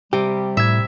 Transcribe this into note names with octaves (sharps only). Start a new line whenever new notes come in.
C3 G3 G4
A2 E5 G#6